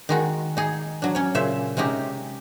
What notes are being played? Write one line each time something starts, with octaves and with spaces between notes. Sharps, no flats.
D#3 G#3 F#4
D#4 G#4
F#3 D4
C#4 C#5
A#2 C#3 C5 E5
C3 G#3 C#4 D#4 G4